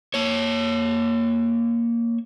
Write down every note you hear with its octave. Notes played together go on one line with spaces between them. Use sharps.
A#3 C#5